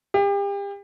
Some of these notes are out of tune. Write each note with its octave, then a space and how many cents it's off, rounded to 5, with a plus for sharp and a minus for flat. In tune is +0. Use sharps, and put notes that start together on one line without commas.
G4 +35